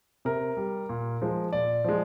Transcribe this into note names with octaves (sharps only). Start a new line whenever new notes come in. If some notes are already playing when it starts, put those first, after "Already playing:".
C3 A#4
G3
A#2
F3 G#3
A#2 D5
F3 G#3